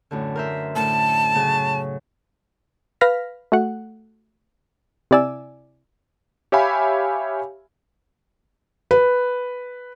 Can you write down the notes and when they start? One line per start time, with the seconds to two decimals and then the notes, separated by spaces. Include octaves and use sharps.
0.11 F#2 A2 D3
0.36 A#4 C5 E5
0.76 A2 D3 A5
1.35 C#3 F#3 C#4
3.01 B4 F5 F6 A#6 B6
3.52 A3 F#4 F#5
5.11 C3 E4 D5 G#5 E6
6.52 G4 C#5 E5 F5 G#5 B5
8.91 B4